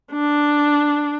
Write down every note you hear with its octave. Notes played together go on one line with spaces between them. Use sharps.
D4